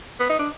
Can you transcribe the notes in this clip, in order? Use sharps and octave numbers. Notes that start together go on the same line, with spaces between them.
B3
D#4
D4